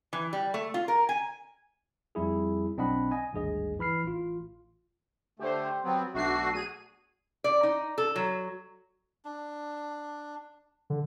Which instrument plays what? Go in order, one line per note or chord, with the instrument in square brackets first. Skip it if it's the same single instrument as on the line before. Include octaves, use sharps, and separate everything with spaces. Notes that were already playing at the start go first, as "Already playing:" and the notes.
[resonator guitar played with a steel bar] E3
G3
A3
F4
A#4
G#5
[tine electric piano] F2 G3 E4 G#4
B1 C4 D4 D#5 F#5 B5
D#5 G#5
G#1 D2 G2 G#4 D#5
E3 B5 F6 C7
A1 F4
[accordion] D3 A3 [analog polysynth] G4 C5
[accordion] F#3 B3 C4
[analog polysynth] B1 D4 C7 [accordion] A3 F#4
[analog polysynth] G#4 D#7
[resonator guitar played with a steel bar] D5
D#4
A4
F#3
[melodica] D4
[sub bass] D3